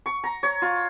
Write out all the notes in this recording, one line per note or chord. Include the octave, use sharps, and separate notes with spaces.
C#6
A#5
C#5
F4